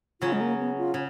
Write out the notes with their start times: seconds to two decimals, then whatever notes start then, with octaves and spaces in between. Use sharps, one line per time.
0.21 C#3 F#3 C#4 F4
0.33 G#3
0.41 A#3
0.58 B3
0.78 F4
0.94 C#3